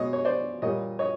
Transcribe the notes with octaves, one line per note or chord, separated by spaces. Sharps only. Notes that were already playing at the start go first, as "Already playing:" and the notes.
Already playing: B2 G#3 C#5 D#5
C#5
C5 D5
A#2 G3 C#5 D#5
C#5 D#5